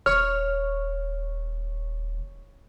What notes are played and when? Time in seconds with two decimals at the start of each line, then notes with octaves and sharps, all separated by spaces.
0.06 D#1 C#5 F6